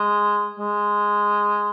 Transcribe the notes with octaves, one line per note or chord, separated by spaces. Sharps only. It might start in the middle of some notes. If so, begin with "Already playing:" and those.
Already playing: G#3
G#3